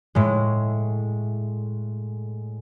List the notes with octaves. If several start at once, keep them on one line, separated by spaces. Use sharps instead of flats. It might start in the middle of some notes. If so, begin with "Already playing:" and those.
A2 G#3